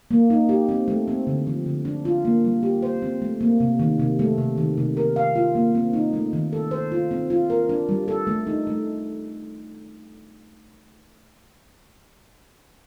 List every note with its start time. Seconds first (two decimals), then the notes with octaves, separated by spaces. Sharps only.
0.11 A#3
0.30 D#4
0.49 G4
0.69 C4
0.88 A3
1.08 C4
1.27 D3
1.47 F3
1.66 D3
1.85 D4
2.05 F4
2.25 A#3
2.44 G3
2.63 G4
2.83 C5
3.02 C4
3.22 A3
3.41 A#3
3.60 C3
3.80 D#3
3.99 C3
4.19 A3
4.38 C3
4.58 D#3
4.78 C3
4.97 A#4
5.16 F5
5.36 F4
5.55 A#3
5.75 C4
5.93 D#4
6.13 A3
6.33 D#3
6.53 A4
6.71 C5
6.92 F4
7.11 C4
7.30 F4
7.50 A#4
7.69 D4
7.89 G3
8.08 A4
8.27 A3
8.47 D#4
8.67 A3